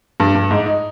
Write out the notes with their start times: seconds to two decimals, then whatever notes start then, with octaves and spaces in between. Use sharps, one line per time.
0.20 G2
0.35 G2
0.51 G#2
0.66 D#4